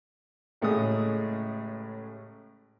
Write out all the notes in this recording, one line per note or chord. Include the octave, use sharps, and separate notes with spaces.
A1 A2 C#3 G#3 C#4 D#6